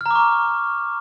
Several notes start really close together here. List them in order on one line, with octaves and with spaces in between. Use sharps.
F6 A#5 D6 C#6